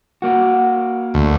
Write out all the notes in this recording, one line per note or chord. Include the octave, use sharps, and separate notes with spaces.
A#3 F#4
D2